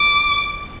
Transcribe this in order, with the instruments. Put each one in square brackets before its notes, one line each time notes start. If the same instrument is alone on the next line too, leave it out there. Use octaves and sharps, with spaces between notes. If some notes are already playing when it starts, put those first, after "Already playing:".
Already playing: [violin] D6